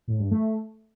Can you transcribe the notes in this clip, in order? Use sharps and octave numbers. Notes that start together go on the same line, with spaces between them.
A2
G2
A3